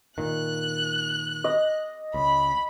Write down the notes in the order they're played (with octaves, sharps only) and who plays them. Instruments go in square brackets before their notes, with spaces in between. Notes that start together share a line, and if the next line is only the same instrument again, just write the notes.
[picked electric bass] A#2 D#3 [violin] F#6
[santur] D#5
[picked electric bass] C#2 [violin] B5